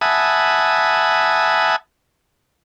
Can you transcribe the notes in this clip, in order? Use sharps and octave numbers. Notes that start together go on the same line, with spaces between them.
E5 F#5 G#5 A5 B5 D#6